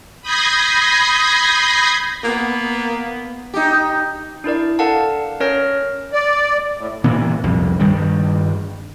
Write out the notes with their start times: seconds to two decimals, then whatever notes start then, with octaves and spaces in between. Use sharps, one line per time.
0.22 B5 D#6 G6 G#6 A#6 C7
2.24 A#3 B3
3.54 D#4 G4
4.44 D4 E4 A#4 D5
4.79 A4 A#4 D5 F5 F#5 A5
5.40 C#4 A#4 C#5 F6 A#6
6.13 D5
6.78 A2
7.04 A#2 E3 B3
7.44 C2 F2
7.80 G2 D#3 G3